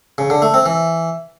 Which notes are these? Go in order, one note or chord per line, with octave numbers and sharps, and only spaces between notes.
C#3
D3
A3
C4
E3